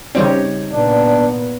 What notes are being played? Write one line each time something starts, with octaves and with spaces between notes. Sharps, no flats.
C#3 G3 C4 D#4 G4 C#5
A#2 B3 D4